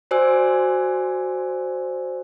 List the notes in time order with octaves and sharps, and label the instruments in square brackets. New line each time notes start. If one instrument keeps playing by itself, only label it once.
[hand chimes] F#4 C5 D5 G#5 E6